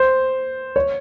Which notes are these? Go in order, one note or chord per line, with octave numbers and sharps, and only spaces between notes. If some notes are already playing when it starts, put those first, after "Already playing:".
Already playing: C5
C#5